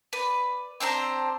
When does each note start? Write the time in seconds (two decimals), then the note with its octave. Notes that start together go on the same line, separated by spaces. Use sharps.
0.13 B4 D5
0.80 C4 D4 C5 A#5